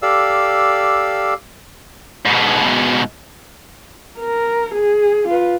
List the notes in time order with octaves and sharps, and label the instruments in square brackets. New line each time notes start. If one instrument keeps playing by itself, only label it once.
[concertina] G4 A4 D5 F5 E6
[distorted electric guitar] G#2 B2
[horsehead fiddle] A#4
G#4
F4 B4